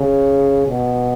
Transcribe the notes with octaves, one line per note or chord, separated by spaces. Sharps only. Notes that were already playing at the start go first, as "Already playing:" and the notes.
Already playing: C#3
B2